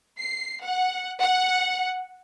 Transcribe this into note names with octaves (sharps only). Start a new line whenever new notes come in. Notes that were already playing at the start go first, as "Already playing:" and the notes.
C7
F#5
F#5